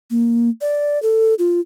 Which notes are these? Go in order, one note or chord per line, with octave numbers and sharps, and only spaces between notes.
A#3
D5
A4
F4